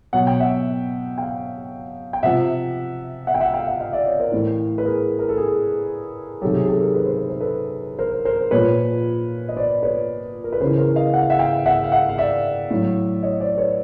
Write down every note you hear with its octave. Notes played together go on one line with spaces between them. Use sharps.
B2 F#3 F#5
G5
E5 F#5
F5 G5
G5
C3 F3 E5 F#5
E5 F#5
G5
E5 F#5
F5 G5
E5 F#5
D#5 F5
D5 E5
C#5 D#5
A#4 C5
A2 E3
B4
G#4 A#4
A#4
A4
G#4
C3 D#3 F#3 G4 A4
G#4
G4 A4
G#4 A#4
B4
C5
B4
C5
A4 B4
A#4 C5
A#4 C5
A#2 F3 B4 C#5
D#5
C5 D5
B4 C#5
A#4
B4
C#3 E3 A#4 C5
A#4 C5
D#5 F5
F#5
F5
E5 F#5
F5 G5
E5 F#5
F5
E5 F#5
F5
D5 E5
A2 F#3
C#5 D#5
C5 D5
B4 C#5